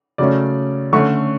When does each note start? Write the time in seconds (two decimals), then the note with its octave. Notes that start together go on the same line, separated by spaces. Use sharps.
0.18 C#3 F#3 A3 C#4 D5
0.93 D3 A3 C#4 C#6